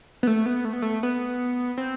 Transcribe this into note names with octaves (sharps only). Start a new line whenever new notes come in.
B3
A3
B3
A3
B3
A3
B3
C4